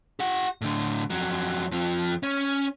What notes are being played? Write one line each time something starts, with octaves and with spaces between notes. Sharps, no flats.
G4 F#5
A2 D3
F2 F#3
F2 F3
C#4 C#5